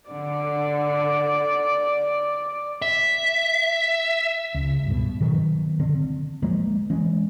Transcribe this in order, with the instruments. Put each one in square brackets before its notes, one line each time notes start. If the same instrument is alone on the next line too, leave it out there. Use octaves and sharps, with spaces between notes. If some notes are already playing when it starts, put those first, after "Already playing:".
[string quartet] D3 [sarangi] D5
[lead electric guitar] E5
[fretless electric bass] C#2
G2 B2
B2 D#3 F#3
D3 C4
F3 G#3 A#3
E3 G#3 C#4